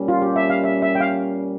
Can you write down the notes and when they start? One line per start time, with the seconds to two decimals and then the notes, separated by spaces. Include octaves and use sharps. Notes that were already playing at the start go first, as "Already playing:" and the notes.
Already playing: A#2 G3 C#4
0.08 F4
0.22 G4
0.36 E5
0.50 F5
0.64 E5
0.82 E5
0.95 G5
1.01 F5